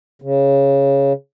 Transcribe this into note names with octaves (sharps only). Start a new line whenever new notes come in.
C#3